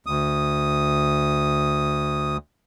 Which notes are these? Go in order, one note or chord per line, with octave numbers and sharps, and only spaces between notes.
D2 D#6